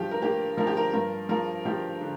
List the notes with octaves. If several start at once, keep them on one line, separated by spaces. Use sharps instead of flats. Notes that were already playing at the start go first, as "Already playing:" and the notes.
Already playing: G2 F3 G4
A#4
A#3 G4
F3 A#4
G4
A#4
G2 A#4
F3 A#4
F3 G4
D3